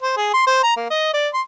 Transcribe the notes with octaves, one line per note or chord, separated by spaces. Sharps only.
C5
G#4
C6
C5
A#5
A#3
D#5
D5
C6